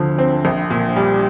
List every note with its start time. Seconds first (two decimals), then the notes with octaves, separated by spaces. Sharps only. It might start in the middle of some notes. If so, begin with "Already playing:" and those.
Already playing: D2 D3 F3
0.18 C4
0.45 A#1
0.70 A#2
0.96 G3